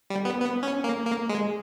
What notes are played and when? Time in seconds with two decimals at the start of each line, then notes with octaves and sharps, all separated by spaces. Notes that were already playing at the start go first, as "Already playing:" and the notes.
0.10 G3
0.25 B3
0.40 B3
0.63 C#4
0.84 A#3
1.06 A#3
1.29 G#3